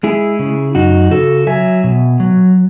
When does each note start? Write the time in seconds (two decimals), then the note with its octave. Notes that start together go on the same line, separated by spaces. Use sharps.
0.03 G#3 E4 G#4
0.39 C#3
0.75 F#2 D#4 F#4
1.11 C#3 F#4 A4
1.47 F#3 E5 G#5
1.84 B2
2.20 F#3